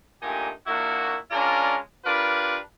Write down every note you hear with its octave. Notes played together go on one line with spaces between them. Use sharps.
G2 A#2 A3 D#4 G4 G#5
A#2 A#3 D4 E4 F#4
G#3 C#4 D4 F4 A#4 D5
D4 F4 G4 A#4 B4